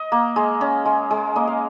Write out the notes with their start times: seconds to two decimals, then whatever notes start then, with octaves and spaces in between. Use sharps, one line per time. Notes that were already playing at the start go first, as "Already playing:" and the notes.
Already playing: D#5
0.12 A#3
0.36 G#3
0.61 C#4
0.85 G#3
1.11 G#3
1.36 A#3 D#5
1.47 F5